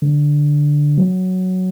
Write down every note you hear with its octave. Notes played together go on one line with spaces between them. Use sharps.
D3
F#3